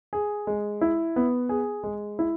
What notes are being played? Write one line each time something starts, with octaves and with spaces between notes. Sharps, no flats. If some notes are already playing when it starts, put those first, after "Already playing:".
G#4
G#3
E4
B3
G#4
G#3
E4